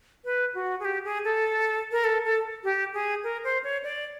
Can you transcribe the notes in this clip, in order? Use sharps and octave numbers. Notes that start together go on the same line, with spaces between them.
B4
F#4
G#4
G4
G#4
A4
A#4
A4
A4
G4
G#4
A#4
C5
C#5
D5